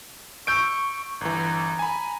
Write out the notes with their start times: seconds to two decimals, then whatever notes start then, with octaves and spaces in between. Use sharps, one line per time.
0.47 C#6 E6 G6 D7
1.21 G1 E3 A#5
1.79 G#5 B5